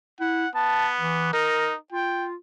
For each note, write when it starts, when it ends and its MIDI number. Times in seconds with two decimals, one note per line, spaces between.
0.20 0.46 64
0.20 0.49 78
0.55 1.33 59
0.55 0.87 81
1.00 1.30 52
1.33 1.76 63
1.33 1.72 70
1.92 2.35 65
1.92 2.27 79